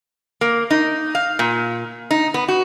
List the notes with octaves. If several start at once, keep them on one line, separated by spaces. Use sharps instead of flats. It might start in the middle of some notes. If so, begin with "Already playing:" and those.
A#3
D#4
F5
A#2
D#4
B3
F#4